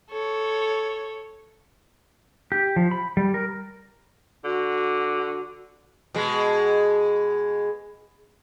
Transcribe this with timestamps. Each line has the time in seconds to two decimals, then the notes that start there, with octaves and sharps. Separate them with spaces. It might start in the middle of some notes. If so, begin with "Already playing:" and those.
0.10 A4 C#5
2.52 G4
2.76 F3
2.91 B5
3.17 G3
3.34 A#4
4.45 D3 F#4
6.14 B2 G#3